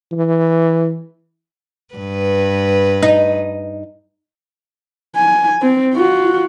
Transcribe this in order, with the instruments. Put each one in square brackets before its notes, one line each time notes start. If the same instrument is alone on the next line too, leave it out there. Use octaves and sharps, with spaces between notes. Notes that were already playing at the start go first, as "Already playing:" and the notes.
[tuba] E3
[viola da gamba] G2 B4
[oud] D#4
[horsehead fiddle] G#5
C4
F4 F#4